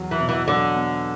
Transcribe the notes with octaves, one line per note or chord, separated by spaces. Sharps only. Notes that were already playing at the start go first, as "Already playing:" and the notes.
Already playing: E2 F#3
E3
B2
E3
D3 F#3
B3